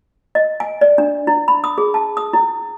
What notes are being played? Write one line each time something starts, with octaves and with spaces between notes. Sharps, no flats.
D#5
G#5
D5
D4
E4
B5
D#6
G#4
A5
D#6
E4